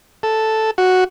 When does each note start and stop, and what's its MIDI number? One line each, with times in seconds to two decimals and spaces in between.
0.23 0.71 69
0.78 1.04 66